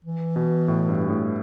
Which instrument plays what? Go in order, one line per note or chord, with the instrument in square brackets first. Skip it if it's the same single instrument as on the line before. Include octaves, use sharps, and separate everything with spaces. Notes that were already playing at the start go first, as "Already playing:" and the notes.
[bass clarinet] E3
[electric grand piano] B2
A2
G2
G2
A2